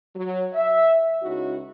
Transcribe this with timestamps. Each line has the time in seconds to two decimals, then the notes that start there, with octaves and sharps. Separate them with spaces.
0.16 F#3
0.53 E5
1.23 C#2 C#4 D#4 E4 F#4